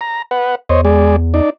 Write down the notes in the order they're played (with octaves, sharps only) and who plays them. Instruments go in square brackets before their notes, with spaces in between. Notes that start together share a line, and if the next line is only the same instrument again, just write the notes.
[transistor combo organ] A#5
B4 F#5
[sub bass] E2 [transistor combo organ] C5 C#5 D#5
[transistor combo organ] G#3 G#4 D5
D#4 D5